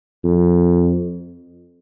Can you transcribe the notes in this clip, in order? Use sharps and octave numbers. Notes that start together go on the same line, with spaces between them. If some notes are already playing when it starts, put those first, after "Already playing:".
F2